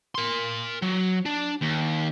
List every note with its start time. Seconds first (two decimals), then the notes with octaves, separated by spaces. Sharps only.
0.15 A#4 C6
0.82 F#3
1.26 D4
1.62 D#2